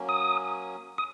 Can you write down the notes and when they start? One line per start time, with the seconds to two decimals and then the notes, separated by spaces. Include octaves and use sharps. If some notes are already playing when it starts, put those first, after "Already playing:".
Already playing: F#3 A#3 C#4
0.09 D#6
0.98 D#6